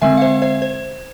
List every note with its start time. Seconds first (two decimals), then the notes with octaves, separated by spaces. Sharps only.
0.01 D3 G#3 C4 E5 G#5
0.17 F5
0.21 C5 E5
0.42 C5 E5
0.62 C5